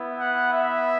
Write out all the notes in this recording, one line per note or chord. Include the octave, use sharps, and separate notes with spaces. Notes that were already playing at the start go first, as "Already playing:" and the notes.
Already playing: B3 E4
F#5
E5